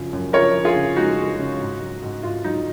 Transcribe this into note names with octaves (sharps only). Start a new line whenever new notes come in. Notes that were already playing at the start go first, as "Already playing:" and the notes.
Already playing: F#2 C#3 F3
F#2
F3 A#4 C#5
F3
F4 G#4
C#3
G#3 D#4 F#4
G#3
C#3
G#2
F#3
G#2
G#2 F4
F#3 D#4